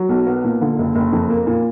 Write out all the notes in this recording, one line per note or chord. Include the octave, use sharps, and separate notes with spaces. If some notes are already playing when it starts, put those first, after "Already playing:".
Already playing: F#3
B1
B3
A#2
D3
F#1
F#1
F2
A#3
A#2